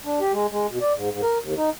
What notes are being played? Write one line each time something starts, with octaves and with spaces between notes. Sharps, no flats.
D4
G4
G#3
G#3
B2
D5
G#2
G#2
A#4
D#2
D#4